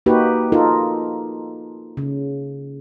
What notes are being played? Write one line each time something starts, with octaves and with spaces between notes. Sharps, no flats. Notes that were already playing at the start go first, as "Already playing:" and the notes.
A#3 D#4 F#4 G4 B4
D#4 F4 A4 A#4
C#3